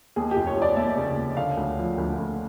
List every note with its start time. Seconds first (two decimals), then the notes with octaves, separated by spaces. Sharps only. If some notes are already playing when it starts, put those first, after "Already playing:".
0.16 D#2 G#4
0.31 G4
0.37 F1
0.47 C#5
0.57 F1 D5
0.76 D#2 E5
0.97 C#3
1.17 D#2
1.37 D3 F5
1.57 D2
1.78 F3
1.98 D2
2.18 D2